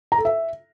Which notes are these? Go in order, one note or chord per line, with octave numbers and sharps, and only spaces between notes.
A#5
A4
E5